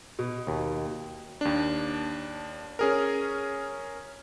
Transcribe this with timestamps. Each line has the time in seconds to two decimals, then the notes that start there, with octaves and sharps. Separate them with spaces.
0.19 B2
0.47 D#2
1.41 D#2 D4
2.79 C#4 G#4 A#4